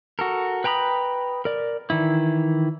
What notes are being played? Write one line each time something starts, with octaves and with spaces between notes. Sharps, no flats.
F#4 A4 A#4
B4 G5 A#5 B5 D#6
A#4 D5
D#3 E3 E4